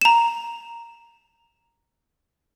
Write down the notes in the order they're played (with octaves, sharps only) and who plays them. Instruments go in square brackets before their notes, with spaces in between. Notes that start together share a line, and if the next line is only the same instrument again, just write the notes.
[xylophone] A#5 E7